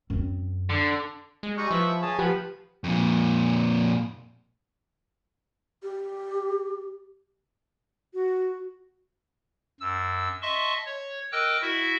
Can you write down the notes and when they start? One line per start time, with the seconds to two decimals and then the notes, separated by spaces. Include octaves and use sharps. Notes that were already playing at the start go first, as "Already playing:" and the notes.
0.10 F#2 C4
0.70 D3
1.43 G#3
1.58 G3 D#4 C#6
1.71 F3 B4 E5
2.02 G#4 C#5 A5
2.19 F3 G4 B4 F#5
2.84 F2 A#2
5.83 G4
8.14 F#4
9.80 F#2 E6
10.42 D#5 E5 A5 C6 C#6
10.86 C#5
11.32 A#4 D#5 G5 D6 E6 F#6
11.62 E4 F#4 E5